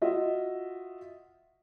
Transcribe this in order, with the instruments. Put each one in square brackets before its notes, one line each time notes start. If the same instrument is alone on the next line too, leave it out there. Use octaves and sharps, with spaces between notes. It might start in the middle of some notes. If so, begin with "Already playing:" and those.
[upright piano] F4 F#4 D#5 E5